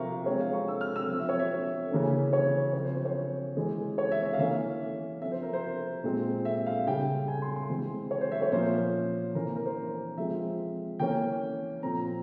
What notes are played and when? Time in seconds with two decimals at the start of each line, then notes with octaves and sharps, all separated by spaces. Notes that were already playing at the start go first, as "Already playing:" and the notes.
Already playing: C3 F3 C4 A#4 E5 F5 C#6
0.26 F3 G#3 C4 C#5
0.40 F5
0.53 C#6
0.68 E6
0.81 F6
0.96 E6
1.08 F3 C4
1.19 E5
1.29 C#5
1.39 E5
1.91 C#3 E3 A#3 C#4
2.33 C#5
2.73 C#3 F3 C4 C#5
2.84 C5
2.95 C5
3.05 C#5
3.57 E3 G#3 C#4
3.98 C#5
4.11 E5
4.25 E5
4.33 F5
4.39 E3 A#3 C#4 E5
5.22 F3 C4 E5
5.32 C5
5.42 A#4
5.53 C5
6.04 A#2 G#3 C4
6.45 E5
6.66 F5
6.87 C#3 G3 C#4 G5
7.28 G#5
7.42 C6
7.56 C6
7.70 E3 G#3 C4
8.11 C#5
8.21 C5
8.32 E5
8.42 C#5
8.52 A#2 F3 A#3 C#4 C5
9.35 E3 A#3 C#4 A#4
9.55 A#4
9.66 C5
10.18 F3 G#3 C4 E5
11.00 E3 A#3 C#4 G5
11.82 A#2 F3 C4 A#5